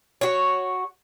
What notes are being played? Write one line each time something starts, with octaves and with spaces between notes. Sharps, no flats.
F#4 C#5